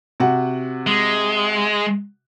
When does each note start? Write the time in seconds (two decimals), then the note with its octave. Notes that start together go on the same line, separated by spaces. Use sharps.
0.20 C3 F#4 F#5
0.87 G#3